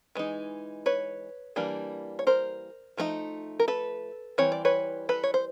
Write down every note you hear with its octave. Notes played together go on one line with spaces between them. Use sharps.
E3 G#3 D#4
B4 C#5
E3 G3 A#3 D4
C#5
A#4 C5
F3 A3 C4 D#4
A#4
A4 B4
E3 G3 C4 C#5
D5
B4 C#5
A4 B4
C#5
C5